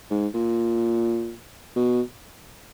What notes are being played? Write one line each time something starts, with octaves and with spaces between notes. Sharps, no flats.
G#2
A#2
B2